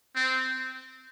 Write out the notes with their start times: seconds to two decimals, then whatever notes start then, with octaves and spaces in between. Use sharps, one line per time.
0.16 C4